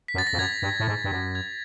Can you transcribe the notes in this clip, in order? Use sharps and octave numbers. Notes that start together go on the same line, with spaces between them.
B6
F#2
A6
A#6
F2
F#2 G#6
A6
G2
A2
G#2
G2
F#2
G#6